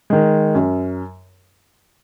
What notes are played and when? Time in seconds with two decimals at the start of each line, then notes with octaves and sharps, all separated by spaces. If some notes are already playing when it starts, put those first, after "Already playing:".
0.10 D#3 G#3
0.54 F#2